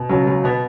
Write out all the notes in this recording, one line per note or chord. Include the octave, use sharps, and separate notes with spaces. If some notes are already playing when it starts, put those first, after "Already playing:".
Already playing: B2
C#2 F#3
F#3
B2 B3